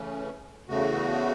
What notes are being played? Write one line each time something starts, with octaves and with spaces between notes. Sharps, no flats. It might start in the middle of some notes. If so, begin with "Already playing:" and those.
Already playing: C#3 E3 A3 C#4
E2 C#3 A3 F#4